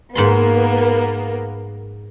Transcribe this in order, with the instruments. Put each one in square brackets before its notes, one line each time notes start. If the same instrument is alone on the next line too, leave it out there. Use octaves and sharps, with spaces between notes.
[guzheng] G#2 B5 C6 [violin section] A#3 B3